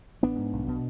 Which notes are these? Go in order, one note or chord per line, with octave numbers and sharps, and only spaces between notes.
A1 B3 D4
G#2
B1
B2